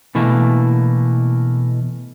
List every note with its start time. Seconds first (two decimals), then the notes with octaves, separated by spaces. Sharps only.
0.15 B2 E3 A3 A#3